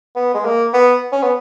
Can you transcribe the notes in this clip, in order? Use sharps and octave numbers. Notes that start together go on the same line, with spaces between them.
B3
G#3
A#3
B3
C#4
B3